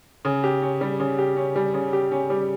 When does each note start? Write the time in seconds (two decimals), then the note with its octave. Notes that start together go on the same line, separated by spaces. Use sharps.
0.25 C#3
0.44 G4
0.62 C#4
0.81 G3
1.00 C#3
1.18 G4
1.36 C#4
1.55 G3
1.74 C#3
1.93 G4
2.11 C#4
2.30 G3